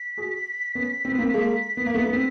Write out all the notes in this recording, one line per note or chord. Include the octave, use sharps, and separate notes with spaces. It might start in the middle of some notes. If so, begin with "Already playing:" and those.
Already playing: B6
F#4 G#4
B3 C#4
C4
B3
A#3 C4
G#3 A#3
B3
A#3
A3 B3
B3
C4